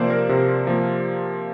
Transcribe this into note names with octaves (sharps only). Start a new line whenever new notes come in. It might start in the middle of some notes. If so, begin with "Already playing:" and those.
Already playing: C3 F3 A#3 C5 D5
A#4
C3
F3 A#3